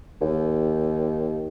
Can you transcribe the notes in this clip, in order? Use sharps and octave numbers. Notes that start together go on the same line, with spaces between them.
D#2